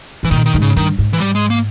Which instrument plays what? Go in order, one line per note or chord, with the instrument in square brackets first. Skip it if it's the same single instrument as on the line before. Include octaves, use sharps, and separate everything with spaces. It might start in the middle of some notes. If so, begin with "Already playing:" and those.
[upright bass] G#2 [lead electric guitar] E3
[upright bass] A#2 [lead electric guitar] D#3
[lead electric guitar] D#3
[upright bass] G#2
[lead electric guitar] C#3
[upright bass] G2 [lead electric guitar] D#3
[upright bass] G#2
[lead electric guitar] E3
G3
G#3
A#3